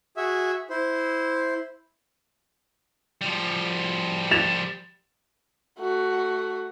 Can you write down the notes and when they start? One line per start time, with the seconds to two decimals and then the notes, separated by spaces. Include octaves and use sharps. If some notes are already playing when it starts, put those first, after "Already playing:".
0.17 F#4 G#4 E5
0.70 E4 C5
3.21 F3 G3
4.31 A6 E7 F7
5.79 A3 F#4